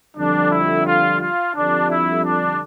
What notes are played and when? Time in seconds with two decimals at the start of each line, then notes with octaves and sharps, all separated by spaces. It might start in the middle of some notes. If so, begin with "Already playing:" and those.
0.17 F2 D3 G3 D4
0.51 E4
0.86 F4
1.21 F4
1.55 F2 D3 G3 D4
1.89 E4
2.24 D4